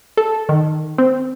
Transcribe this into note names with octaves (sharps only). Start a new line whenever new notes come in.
A4
D#3
C4